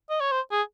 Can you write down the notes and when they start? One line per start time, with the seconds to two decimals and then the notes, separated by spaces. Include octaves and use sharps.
0.10 D#5
0.20 C#5
0.32 C5
0.52 G#4